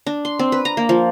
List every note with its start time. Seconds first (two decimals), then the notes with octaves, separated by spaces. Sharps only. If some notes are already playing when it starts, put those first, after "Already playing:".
0.07 D4
0.25 C6
0.39 C4
0.52 B4
0.65 A#5
0.77 A#3
0.89 F3